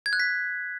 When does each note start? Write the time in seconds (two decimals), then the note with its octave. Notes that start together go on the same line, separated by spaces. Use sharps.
0.06 G#6
0.13 F#6
0.20 B6